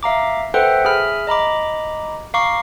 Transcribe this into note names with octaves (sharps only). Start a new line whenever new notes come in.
E5 F5 A#5 D6
A4 B4 C5 E5 F#5 G5
G#4 E5 G#5 B5 F6
D#5 A#5 B5 D6
F5 A#5 C#6 D6 C7